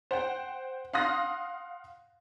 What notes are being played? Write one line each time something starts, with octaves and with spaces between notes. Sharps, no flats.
C5 F#5 G5
F5 F#5 C6 D#6 F#6 A#6